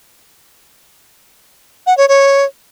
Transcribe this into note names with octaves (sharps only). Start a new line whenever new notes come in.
F#5
C#5
C#5